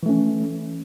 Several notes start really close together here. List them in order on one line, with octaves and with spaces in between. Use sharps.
E3 A3 C#4